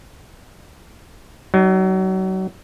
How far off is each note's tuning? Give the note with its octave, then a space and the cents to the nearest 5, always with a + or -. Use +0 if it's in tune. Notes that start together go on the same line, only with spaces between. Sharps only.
F#3 +30 D#4 -5